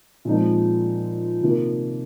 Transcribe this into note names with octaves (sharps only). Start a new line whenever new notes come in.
A#2 F3 G#3 C4 D#4
C3 D#3 A#3 F4